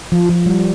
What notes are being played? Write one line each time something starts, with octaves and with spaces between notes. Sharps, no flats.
F3
F3
G3